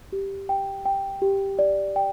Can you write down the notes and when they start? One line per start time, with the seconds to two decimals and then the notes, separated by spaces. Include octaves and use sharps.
0.12 G4
0.49 G5
0.85 G5
1.22 G4
1.59 D5
1.96 G5